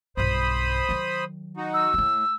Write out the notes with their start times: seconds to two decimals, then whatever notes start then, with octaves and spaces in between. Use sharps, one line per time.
0.17 B1 G2 C5 B5 D#6
0.89 D#3 F#3
1.57 D#4 F#4
1.74 E6
1.94 A2 G#3 A3